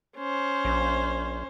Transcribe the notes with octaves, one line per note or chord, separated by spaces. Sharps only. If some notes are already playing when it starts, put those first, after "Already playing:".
C#4 C5
A#1